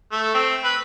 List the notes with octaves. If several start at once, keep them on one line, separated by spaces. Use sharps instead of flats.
A3
C4
B4